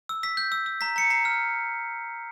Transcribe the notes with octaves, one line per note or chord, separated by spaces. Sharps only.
E6
E6 B6
G6
E6
E6
A#5 B6
A#5 C#7
A#5 C7
F6